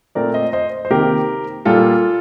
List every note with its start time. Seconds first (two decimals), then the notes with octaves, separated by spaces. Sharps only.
0.15 A#2 A3 C4 A#4 D5
0.34 C5 D#5
0.53 C5 D#5
0.85 C5
0.90 C3 D#3 A#3 G4 A#4
1.65 A#2 G3 A#3 F4 A4